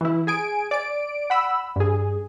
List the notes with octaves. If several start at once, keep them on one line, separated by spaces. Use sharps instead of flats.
E3 E4
G#4 G#5 D7
D5 D7
F#5 B5 E6
G2 G#4